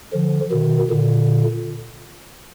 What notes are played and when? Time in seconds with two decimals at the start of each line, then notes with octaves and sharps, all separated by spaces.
0.13 D3 F3
0.51 B2 D#3
0.90 A#2 D3